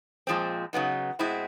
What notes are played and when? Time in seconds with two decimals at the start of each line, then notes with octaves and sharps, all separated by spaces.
0.27 A#2 F3 G#3 C4
0.73 C#3 F#3 B3 D#4
1.19 B2 G#3 C4 E4